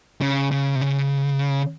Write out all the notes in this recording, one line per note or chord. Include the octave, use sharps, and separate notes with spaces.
C#3
C#3
C3
C#3